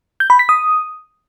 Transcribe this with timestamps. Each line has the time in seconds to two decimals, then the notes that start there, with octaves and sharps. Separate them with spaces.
0.20 G6
0.30 B5
0.39 B6
0.49 D#6